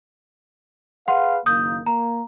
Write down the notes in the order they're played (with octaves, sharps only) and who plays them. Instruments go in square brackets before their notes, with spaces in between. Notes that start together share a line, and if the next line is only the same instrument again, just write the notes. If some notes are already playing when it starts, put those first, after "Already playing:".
[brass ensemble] G#4 B4 F5 [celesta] F#5 C6
[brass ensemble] F#1 D#3 A#3 [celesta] D#6 G6
[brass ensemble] A#3 [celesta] A#5